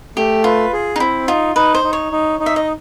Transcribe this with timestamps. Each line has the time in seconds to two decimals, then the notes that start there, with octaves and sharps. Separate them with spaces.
0.17 A3 G4
0.44 F4 B4
0.73 G#4
0.96 D#4
1.00 C4 E4
1.27 D#4 F4
1.55 D#4 B4
1.75 C5
1.84 D#4
1.93 C#5
2.12 D#4
2.40 D#4
2.46 E5
2.56 D#5